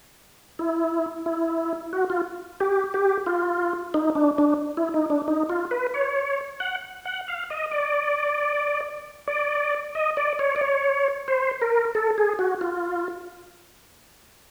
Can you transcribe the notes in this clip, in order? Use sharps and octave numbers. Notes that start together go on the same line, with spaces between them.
E4
E4
F#4
F4
G4
G4
F4
D#4
D4
D4
E4
D#4
D4
D#4
F4
B4
C#5
F#5
F#5
F5
D#5
D5
D5
D#5
D5
C#5
D5
C#5
C5
A#4
A4
G#4
F#4
F4